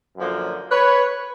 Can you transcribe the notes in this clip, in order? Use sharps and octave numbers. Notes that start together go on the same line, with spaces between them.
F#2 D3 F3 A#3
B4 C#5